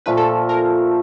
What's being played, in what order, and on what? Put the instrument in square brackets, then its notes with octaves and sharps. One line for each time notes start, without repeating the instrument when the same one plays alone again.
[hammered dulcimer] A#2 F3 A3 [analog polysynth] B4
[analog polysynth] A4
A#4